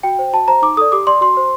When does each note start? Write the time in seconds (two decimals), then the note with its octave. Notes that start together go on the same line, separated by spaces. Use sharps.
0.03 F#4 G5
0.19 C5
0.33 F#4 A5
0.48 C5 A#5
0.62 D#4 D6
0.77 A4 D5 D#6
0.92 G4 D6
1.07 D5 C6
1.21 F#4 C6
1.37 C5